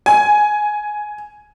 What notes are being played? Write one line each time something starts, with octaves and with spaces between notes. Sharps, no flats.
G#5